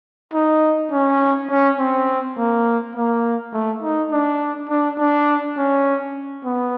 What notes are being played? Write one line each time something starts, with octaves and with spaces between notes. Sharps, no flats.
D#4
C#4
C#4
C4
A#3
A#3
A3
D#4
D4
D4
D4
C#4
B3